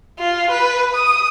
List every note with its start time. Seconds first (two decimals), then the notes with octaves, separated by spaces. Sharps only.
0.19 F4
0.51 B4
0.95 D#6